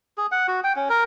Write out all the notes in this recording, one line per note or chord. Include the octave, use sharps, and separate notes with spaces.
G#4
F#5
F#4
G5
C#4
A#4